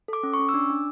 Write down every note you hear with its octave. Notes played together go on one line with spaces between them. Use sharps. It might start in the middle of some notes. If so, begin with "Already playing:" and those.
A4 D6
C#4
C#6
C#4
E6
D4 D6
D4